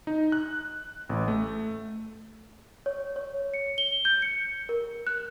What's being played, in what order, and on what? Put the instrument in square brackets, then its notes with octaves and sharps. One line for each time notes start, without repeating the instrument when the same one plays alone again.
[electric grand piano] D#4
F#6
A1
A3
[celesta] C#5
C#5
C#7
G7
G6
C#7
A#4
F#6